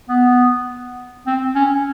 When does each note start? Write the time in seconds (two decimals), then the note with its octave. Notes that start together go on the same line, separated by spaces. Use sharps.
0.09 B3
1.27 C4
1.55 C#4